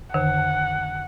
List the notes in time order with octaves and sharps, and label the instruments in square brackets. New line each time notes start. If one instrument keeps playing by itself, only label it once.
[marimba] F2 D3 D#3 [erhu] F#5